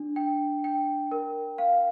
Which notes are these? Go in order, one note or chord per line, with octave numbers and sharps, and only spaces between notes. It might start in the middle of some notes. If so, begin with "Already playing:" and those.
Already playing: D4
G5
G5
A#4
F5